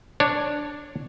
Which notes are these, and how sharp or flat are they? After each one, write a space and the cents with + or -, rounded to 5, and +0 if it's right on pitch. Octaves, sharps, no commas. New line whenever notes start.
D4 +0 C#5 +0